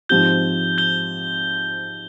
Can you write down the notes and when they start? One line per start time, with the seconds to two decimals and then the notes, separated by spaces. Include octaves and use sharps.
0.09 G#2 F3 C4 G4 G6 G7
0.78 G6 G7